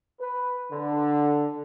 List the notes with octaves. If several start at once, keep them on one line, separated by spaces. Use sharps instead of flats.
B4
D3